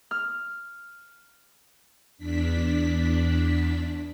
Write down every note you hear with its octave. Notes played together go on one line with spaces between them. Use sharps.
F6
E2 D4 B6